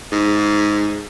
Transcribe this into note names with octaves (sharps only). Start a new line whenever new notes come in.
G#2